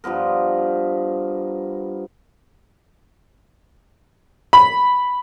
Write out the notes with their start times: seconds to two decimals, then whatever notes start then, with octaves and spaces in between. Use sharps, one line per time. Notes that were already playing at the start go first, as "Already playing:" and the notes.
0.04 G2 F3 B3 A#4
4.53 B5